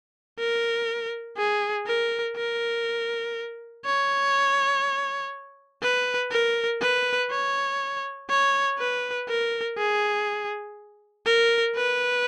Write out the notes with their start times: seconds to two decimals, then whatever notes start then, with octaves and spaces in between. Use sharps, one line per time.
0.39 A#4
1.37 G#4
1.87 A#4
2.37 A#4
3.85 C#5
5.82 B4
6.31 A#4
6.81 B4
7.30 C#5
8.30 C#5
8.79 B4
9.28 A#4
9.78 G#4
11.26 A#4
11.76 B4